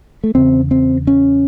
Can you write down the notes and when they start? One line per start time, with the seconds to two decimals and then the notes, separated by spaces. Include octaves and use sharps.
0.24 A3
0.35 E2 C#3 C4
0.71 C4
1.07 C#4